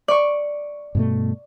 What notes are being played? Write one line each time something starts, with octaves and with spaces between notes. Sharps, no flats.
D5 C#6
G2 B2 A3